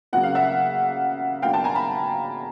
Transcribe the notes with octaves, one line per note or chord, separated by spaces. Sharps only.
C#3 F#3 A#3 F#5
F5
E5 F#5
B2 F#3 A#3 D4 F5 G5
G5 A5
G#5 A#5
A5 B5